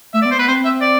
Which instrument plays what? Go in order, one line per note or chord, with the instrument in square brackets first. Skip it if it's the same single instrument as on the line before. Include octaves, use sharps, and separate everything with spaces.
[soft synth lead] A3 [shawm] E5
[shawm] D5
[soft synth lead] B3
[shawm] C5
[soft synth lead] B3 [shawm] B4
[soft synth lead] C4 [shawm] C5
[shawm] E5
D5